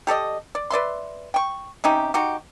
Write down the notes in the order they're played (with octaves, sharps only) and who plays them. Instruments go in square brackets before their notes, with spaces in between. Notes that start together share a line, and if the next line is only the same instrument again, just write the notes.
[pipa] G4 A4 D5 D#5
D5
B4 D5 E5 C6
G5 C#6
C3 C#4 D#4 G4
D#4 F#4 G4